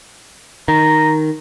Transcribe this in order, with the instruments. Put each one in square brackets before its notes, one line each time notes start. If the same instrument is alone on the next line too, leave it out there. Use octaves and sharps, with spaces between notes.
[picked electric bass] D#3 [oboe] A#5